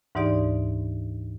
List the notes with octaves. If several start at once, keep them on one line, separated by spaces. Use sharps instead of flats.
D2 G#2 E3 D#4 G4 D5